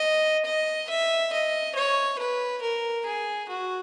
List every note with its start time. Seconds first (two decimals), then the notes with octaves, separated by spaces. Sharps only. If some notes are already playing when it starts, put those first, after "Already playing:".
Already playing: D#5
0.45 D#5
0.89 E5
1.33 D#5
1.76 C#5
2.19 B4
2.62 A#4
3.06 G#4
3.49 F#4